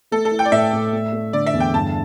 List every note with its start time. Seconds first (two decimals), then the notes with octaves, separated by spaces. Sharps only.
0.12 A3 A4
0.25 A4
0.31 E4
0.39 G5
0.45 D5
0.52 A2 E5
0.73 A2
0.92 A3
1.13 A3
1.33 D3 D5
1.46 E5
1.54 E2
1.60 G5
1.74 G2 A5